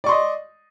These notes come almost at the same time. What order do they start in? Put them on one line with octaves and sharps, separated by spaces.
D5 C#6 C6 D#5